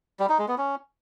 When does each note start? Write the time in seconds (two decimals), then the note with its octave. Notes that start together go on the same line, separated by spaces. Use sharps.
0.20 G3
0.29 D#4
0.39 G#3
0.48 B3
0.58 C#4